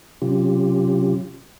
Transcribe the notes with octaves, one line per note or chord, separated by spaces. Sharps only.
C3 F#3 C#4 F4 G4